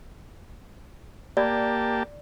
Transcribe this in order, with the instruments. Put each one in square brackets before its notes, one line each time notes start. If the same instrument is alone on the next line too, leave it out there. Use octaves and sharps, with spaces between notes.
[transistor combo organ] A#3 G4 A5 [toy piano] D5